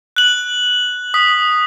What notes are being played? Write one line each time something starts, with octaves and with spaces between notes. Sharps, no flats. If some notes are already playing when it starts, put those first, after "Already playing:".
F#6 F#7
D#6 B6